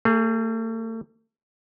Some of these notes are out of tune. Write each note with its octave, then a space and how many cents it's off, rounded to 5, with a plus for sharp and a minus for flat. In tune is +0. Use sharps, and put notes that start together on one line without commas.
A3 +40 G#4 +0